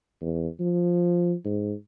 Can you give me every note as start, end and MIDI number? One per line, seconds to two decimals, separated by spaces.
0.21 0.48 40
0.60 1.33 53
1.45 1.73 44